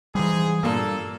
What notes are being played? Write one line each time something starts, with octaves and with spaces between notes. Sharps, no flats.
G#2 E3 G3 G#4
G2 A#2 A#3 A4